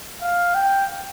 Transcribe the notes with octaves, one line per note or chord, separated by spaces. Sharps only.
F5
G5